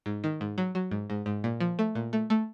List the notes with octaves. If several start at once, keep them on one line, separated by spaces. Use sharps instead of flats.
G#2
D#3
G#2
F#3
F#3
G#2
G#2
G#2
A#2
F3
A3
A#2
A3
A3